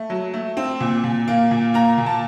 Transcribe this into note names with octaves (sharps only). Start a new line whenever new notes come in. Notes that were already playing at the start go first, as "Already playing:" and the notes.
Already playing: A3
F#3
A3
C4
A#2
A#2
A#3
A#2
A#3 A#5
A#2
A5